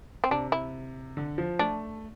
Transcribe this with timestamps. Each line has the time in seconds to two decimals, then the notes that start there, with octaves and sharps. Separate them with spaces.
0.24 C4
0.31 C3 D4
0.52 E4
1.17 D3
1.38 F3
1.59 A3 D4